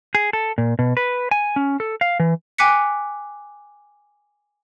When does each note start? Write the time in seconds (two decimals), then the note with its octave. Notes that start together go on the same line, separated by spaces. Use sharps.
0.15 G#4
0.33 A4
0.58 A#2
0.79 B2
0.97 B4
1.31 G#5
1.56 C#4
1.80 A4
2.01 F5
2.20 E3
2.58 G5 G#5 D6 F#6 B6 C#7